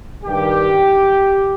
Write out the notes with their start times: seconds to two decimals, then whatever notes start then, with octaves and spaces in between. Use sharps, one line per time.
0.24 G2 D#3 G4